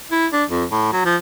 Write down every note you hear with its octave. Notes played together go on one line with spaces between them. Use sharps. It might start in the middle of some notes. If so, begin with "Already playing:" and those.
E4
D4
F2
A2
F#3
F3